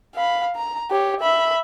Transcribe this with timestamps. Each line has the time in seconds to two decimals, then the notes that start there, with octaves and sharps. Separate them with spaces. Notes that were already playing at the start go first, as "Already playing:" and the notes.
0.15 F5 B5
0.56 A#5
0.91 G4 C#5
1.20 E5 B5